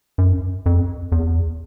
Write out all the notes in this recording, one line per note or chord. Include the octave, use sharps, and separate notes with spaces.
F#2
F2
E2